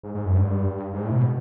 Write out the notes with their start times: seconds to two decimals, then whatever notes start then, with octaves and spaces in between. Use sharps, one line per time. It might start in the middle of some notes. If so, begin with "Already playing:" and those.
0.03 G#2
0.15 G#2
0.26 F#2
0.37 G2
0.94 G#2
1.05 A2
1.12 C3
1.16 B2